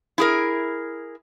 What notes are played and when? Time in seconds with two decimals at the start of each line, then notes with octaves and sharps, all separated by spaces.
0.18 E4 G#4 A#4